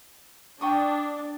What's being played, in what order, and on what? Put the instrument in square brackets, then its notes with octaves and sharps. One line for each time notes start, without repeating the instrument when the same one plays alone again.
[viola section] D4 [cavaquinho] G5 C#6 D#6